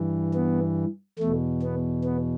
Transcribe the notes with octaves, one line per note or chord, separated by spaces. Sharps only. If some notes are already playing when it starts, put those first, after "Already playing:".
Already playing: G2 E3
B3
E2 B2 A3
B3
B3